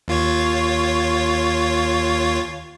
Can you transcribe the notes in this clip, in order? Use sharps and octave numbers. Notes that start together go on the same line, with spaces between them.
D#2 F4 C#5